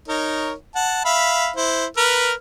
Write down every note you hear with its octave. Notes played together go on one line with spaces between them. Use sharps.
D#4 A#4 C#5
F#5 A5
E5 F5 B5
E4 C5
A#4 B4 F6